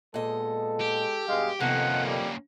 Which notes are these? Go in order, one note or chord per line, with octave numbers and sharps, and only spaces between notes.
A#2 G#3 B3 A4 D#5
G4
G2 B2 G#3 F5
F2 C3 D#3 A#3 B3 C#4 A4 F#5
G3